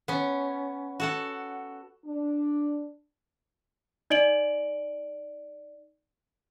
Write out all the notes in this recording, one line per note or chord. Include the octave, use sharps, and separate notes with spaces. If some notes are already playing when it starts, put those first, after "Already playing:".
B3 C#4
F#4 A4 F#5
D4
D#4 D5 D#5 D7 F#7